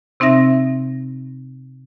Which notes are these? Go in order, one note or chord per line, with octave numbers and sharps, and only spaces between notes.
C3 C4 D#4 E5 A#6